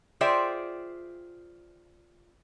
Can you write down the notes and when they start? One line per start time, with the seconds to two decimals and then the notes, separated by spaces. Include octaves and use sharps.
0.21 F4 G#4 C5 D5 E5 G5